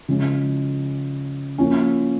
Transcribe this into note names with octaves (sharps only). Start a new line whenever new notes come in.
C#3 F3 G#3 C#4
F3 A#3 C#4